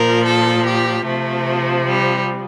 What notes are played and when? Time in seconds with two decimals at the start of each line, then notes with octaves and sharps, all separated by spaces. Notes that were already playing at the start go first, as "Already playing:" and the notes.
Already playing: A#2 F3 A#4
0.26 A4
0.67 G4
1.06 C3 F3 A3
1.87 G3